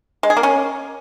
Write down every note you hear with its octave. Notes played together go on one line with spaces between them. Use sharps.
G#3
G#4
A#3
C#4